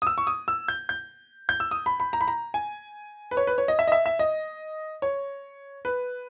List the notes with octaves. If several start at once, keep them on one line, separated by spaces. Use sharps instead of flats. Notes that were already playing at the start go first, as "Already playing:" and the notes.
D#6
E6
C#6
D#6
E6
G6
G6
G6
E6
D#6
B5
B5
A#5
B5
A#5
G#5
B4
C#5
B4
C#5
D#5
E5
D#5
E5
E5
D#5
C#5
B4